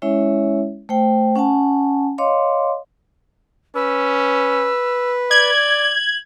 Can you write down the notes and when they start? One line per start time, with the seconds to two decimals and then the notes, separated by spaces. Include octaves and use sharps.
0.02 G#3 C#4 E4 C#5 E5
0.89 A3 C5 G5
1.35 C#4 F#5 G#5 A5
2.18 C#5 D#5 F5 C6 D6
3.75 C#4 B4 E6
5.31 D5 G#6 F#7